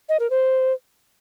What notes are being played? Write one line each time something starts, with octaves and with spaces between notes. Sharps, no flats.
D#5
A#4
C5